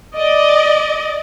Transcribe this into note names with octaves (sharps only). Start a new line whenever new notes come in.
D5 D#5